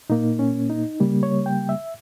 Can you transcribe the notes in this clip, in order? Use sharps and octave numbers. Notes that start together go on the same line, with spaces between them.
A#2 A#3 D#4
C#4
D#4
C#3 G3 A#3
C#5
G5
E5